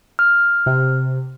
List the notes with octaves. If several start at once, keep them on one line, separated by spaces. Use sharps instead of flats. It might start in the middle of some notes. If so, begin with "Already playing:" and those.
F6
C3